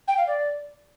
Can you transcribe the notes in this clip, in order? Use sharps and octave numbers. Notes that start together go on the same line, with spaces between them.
G5
F5
D5